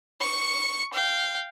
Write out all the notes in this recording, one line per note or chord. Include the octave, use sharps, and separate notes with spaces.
C#6 C#7
F5 G5